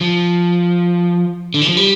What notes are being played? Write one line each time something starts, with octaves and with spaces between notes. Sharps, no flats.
F3
D3
E3
F3
G3